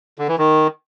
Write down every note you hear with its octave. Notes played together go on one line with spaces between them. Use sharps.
D3
E3
D#3